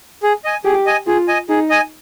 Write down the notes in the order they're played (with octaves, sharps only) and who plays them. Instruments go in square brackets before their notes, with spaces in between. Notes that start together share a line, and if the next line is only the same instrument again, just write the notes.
[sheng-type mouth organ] G#4
D#5 G#5
[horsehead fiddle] G4 [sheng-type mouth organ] G#4
[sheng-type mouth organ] D#5 G#5
[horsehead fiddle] F4 [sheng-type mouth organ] G#4
[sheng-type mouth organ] D#5 G#5
[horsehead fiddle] D#4 [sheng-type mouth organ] G#4
[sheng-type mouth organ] D#5 G#5